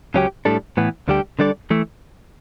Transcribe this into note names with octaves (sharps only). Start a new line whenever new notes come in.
C#2 C#3 F#3 C#4 G4
A2 G3 D4 A4
A2 E3 B3
D2 D3 G3 D4 G4
D3 G3 D4 A4 D5
E3 A3 E4